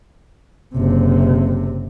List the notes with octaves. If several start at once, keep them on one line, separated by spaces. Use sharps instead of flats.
F#1 C3